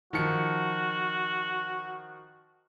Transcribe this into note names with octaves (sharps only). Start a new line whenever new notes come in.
D#3 F3 F#4 C#7